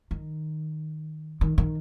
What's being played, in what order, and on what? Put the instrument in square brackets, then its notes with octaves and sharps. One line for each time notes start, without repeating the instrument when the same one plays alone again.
[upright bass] D#3
D#3
D#3